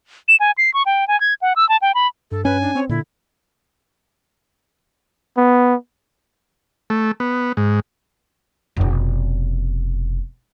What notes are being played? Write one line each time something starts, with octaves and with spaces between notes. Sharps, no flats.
E7
G#5
C7
C#6
G5
G#5
G#6
F#5
E6
A5
G5
B5
G2 A4
C#4 B4 G#5
D4
C4 C#5
A#2 D3 E4
B3
A3
B3
G#2
F1 B2